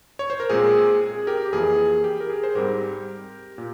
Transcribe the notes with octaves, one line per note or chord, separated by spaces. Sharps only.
C#5
C5
A#4
A#2 G#3 C4 G#4
G#4
G4 A#4
G4
F2 E3 A#3 G#4
G4
A#4
G#4
C5
G#2 G3 C4 G4 A#4
A#2